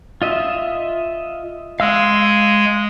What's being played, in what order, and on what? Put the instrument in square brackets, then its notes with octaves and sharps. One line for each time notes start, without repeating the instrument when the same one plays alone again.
[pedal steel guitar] F4 D#5 E5
[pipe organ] G#3 [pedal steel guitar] F5 E6